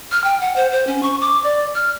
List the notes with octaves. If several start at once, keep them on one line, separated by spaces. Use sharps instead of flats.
F6
G5
F#5
C5
C5
C#4
C#6
D6
D5
F6